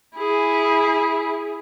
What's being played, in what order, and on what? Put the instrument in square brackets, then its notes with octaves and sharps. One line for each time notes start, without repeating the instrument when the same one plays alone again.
[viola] E4 G#4